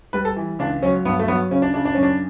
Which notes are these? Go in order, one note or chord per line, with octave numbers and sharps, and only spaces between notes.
G3 B4
A4
E3
C#2 D4
F#3 C#4
G2 B3
A3
F#3 B3
C#3 C#4
D4
C#3 D4
D4
F#2 C#4
D4